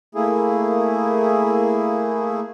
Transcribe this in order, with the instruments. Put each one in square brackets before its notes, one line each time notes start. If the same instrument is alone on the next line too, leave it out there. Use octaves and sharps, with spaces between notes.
[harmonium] A3 A#3 E4 G#4